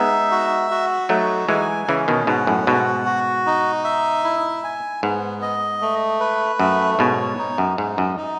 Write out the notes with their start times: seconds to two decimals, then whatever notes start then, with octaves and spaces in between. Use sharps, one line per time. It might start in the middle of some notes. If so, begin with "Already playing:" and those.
Already playing: G#3 B3 D#4 E5
0.31 F#4
0.71 F#4
1.09 F#3 A3 D#4
1.48 E3 G#3 G#5
1.88 C#3 E3 C#4
2.08 B2 D#3
2.27 G#2 B2 F#5
2.47 F#2 A2
2.67 G#2 B2 F#4
3.06 F#4
3.46 D#4
3.84 E5
4.24 E4
4.64 G#5
5.03 G#2 B3
5.42 D#5
5.81 A3
6.20 B4
6.59 F#2 A3
6.99 G#2 B2 C#5
7.39 D#4
7.58 F#2
7.78 G#2 D#4
7.98 F#2
8.17 D#4